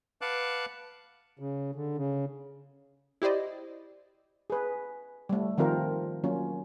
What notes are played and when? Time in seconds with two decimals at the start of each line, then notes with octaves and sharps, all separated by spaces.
0.21 B4 F5 F#5 A5 D6 F#6
1.39 C#3
1.75 D3
1.97 C#3
3.22 E4 G4 C5 D5 D#5
4.50 G#4 B4
5.29 G3 A3
5.58 D#3 F3 C4 F4 A#4 C5
6.24 F#3 A#3 C#4 F4